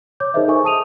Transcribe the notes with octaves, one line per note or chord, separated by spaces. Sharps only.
C#5 D6 G6
D#4 G#4 A#4 C5 D#5 E5
A4 A#4 G#5 C#6
A5 D#6 D#7 F7